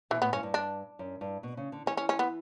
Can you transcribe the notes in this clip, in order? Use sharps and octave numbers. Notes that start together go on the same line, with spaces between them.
B2 E3
A2 B3
G2 C#4
G2
D4
F#2
G2
B2
C#3
D3
E3 C#4
C#4
C#4
B3